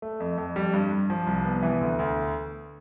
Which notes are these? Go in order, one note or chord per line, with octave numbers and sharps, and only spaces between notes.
A3
F2
F2
G3
G2
G2
F3
C2
B3
E3
D2
D2